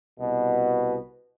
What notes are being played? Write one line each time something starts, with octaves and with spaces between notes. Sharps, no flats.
C2 B2